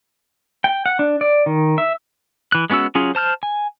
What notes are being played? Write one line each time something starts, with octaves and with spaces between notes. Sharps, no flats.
G5
F#5
D4
D5
D#3
E5
E3 F#6
G#3 B3 C#4 F#4 E6
F#3 C#4 F4 G#4
C5 A5 F6 G6
G#5